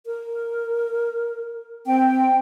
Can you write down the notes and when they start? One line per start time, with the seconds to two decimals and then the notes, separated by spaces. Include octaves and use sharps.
0.06 A#4
1.86 C4 G5